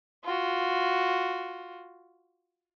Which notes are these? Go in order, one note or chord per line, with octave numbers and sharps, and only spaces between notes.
F4 F#4